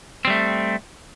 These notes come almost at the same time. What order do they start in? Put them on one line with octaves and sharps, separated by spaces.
C4 G3 A3